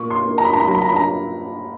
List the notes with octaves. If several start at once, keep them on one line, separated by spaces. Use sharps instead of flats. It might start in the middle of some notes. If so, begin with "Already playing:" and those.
Already playing: A#2 C#6
C6
A#3
A#5
B5
A#5
B5
F#3 A#5
B5
A#5
B5
A#5